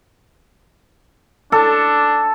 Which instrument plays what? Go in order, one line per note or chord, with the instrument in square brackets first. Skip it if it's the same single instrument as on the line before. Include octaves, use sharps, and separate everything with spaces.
[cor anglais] D4 [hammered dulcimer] A4